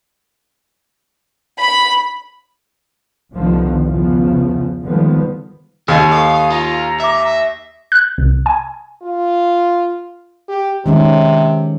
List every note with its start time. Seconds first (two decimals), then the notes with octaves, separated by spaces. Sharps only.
1.60 B5
3.34 C2 D3 D#3 F3 G3 B3
3.83 E2 C#3 F3 B3
4.86 D3 D#3 F3 G3 G#3 B3
5.88 D#2 G#4 D#5 F5 E6 F6
6.11 A4 F5 C#6
6.27 D#6
6.50 F4 A#5
7.00 E5 D6 E6
7.24 A#6
7.92 F#6
8.18 C2
8.46 G#5
9.03 F4
10.49 G4
10.86 C3 D#3 G#3 C#4